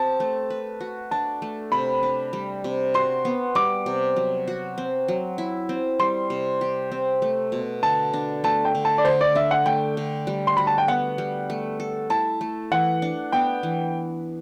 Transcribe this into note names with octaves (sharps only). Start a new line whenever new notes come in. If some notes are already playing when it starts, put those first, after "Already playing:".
Already playing: C4 G4 A5
A3
B4
F#4
D4 A5
A3
C3 B5
D4
G3
C3
F#4 C6
B3
G3 D6
C3
F#3
F#4
C4
F#3
E4
C4
G3 C6
C3
G4
C4
A3
B2
D3 A5
D4
A3 A5
G5
D3
A5
D5
D3 C5
D5
D4 E5
F#5
A3 G5
D3
G3
C6
F#4 B5
A5
G5
B3 F#5
G3
A3
A4
E4 A5
A3
E3 F#5
D4
B3 G5
E3